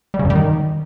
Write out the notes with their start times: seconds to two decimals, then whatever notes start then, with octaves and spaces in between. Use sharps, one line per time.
0.14 G3
0.19 C#3
0.25 F#2
0.30 G3
0.35 D#3